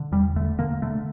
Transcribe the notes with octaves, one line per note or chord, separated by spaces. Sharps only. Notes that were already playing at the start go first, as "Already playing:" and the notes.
Already playing: D3
E2 G3
D3 A3
D3 A#3
D3 A3